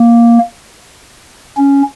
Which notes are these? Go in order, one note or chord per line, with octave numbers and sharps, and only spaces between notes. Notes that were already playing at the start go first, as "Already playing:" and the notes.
Already playing: A#3
C#4